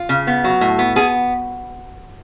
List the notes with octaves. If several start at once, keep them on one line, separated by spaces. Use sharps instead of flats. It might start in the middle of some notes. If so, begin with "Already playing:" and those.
Already playing: F4
C#3
B3
F#3
A2
B3
B3 G#4